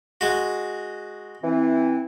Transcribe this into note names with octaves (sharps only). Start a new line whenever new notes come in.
G#3 F#4
E3 C4